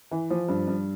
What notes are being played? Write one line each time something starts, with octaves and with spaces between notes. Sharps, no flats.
E3
F3
G2
G2